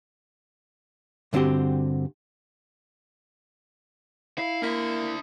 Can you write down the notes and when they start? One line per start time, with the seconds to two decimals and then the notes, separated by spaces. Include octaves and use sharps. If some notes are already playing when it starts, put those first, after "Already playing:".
1.33 G2 D3 C4 F#4 G4
4.38 E4 F5
4.62 A#3 D4 E5